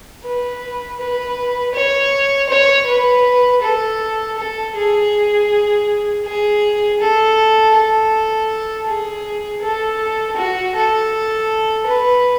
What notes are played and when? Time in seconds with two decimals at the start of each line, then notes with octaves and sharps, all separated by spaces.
0.24 B4
1.00 B4
1.74 C#5
2.49 C#5
2.87 B4
3.62 A4
4.37 A4
4.75 G#4
6.24 G#4
7.00 A4
7.74 A4
8.87 G#4
9.61 A4
10.36 F#4
10.75 A4
11.86 B4